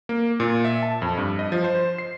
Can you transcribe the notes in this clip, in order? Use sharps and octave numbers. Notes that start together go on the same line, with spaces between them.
A#3
A#2
E5
A5
F2
G2
D#5
F3
C5
C7